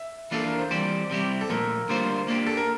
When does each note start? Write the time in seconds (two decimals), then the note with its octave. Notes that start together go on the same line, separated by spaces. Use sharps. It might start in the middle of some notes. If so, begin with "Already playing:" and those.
Already playing: E5
0.31 E3 A#3 D4 F4 A4
0.47 A#4
0.59 C5
0.71 E3 G3 C4 G4 C5 D5
1.10 C3 G3 C4 E4 G4
1.41 A4
1.49 A#2 F3 A3 A#4
1.89 D3 G3 A#3 F4 C5
2.28 A#3 D4 G4
2.47 A4
2.57 A#4